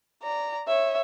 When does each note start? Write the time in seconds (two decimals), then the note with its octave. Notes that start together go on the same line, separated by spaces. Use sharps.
0.23 D5 A#5
0.67 C#5 E5